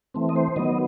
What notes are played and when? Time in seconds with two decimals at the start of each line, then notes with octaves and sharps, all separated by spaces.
0.14 E3 A3 C4
0.29 D#5
0.36 C5
0.56 D#3 F#3 B3 D#5